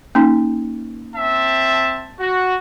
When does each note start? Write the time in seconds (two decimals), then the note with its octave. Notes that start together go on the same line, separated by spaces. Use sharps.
0.15 A#3 C#4 D#4
1.16 C4 E5 A5
2.20 F#4